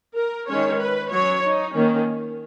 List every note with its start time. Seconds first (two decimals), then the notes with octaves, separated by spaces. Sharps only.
0.16 A#4
0.48 D#3 G#3 C#4 C#5
0.80 B4
1.12 F#3 C#4 C#5
1.44 D#4
1.75 D#3 A#3 C#4